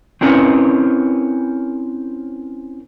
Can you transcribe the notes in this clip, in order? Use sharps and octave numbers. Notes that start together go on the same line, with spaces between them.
C4 C#4 E4 A#4 B4 C#5